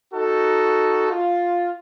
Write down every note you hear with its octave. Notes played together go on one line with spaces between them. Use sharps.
D#4 F#4 A4
F4